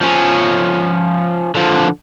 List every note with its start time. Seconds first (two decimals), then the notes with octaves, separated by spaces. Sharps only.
0.01 F3 C#4
1.55 D3 F3